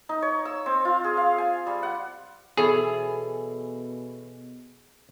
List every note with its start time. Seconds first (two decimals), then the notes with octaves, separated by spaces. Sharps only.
0.09 D#4
0.22 C#5
0.45 E6
0.66 C4
0.85 F4
1.04 G#4
1.17 F5
1.38 G#5
1.67 G3
1.83 F#5
2.57 B2 E3 G#4 A4 C#5